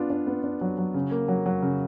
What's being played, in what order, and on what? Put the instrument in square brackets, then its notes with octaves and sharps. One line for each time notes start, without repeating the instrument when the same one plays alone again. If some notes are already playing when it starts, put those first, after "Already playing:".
Already playing: [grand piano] B3 D4 F4
D4
B3
D4
F#3
F#3
C#3
A#3
F#3
F#3
C#3